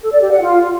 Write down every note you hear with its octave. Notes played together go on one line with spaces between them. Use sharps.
A4
D5
G4
F#5
F4